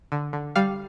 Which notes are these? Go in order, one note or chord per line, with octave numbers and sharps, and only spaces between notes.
D3
D3
G3 F5